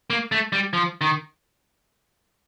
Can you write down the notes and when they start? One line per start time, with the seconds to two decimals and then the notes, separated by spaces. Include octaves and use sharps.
0.10 A#3
0.32 A3
0.53 G3
0.73 F3
1.01 D#3